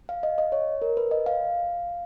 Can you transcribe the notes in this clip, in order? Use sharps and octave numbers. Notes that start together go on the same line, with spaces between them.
F5
D#5
D#5
C#5
A#4
B4
D#5
F5